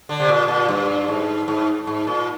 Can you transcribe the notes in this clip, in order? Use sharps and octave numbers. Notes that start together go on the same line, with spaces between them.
D3
C3
A#2
A#2
G2
G#2
G#2
G#2
A#2